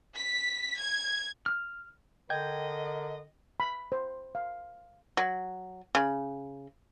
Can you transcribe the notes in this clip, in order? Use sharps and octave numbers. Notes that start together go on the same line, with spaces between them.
B6
G#6
F6
D3 A#4 D#5 G5 G6 G#6
B5
C5
F5
F#3
C#3